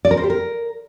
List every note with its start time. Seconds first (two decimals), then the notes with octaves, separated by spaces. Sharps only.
0.05 D5
0.11 A#4
0.17 C5
0.24 G4
0.30 A#4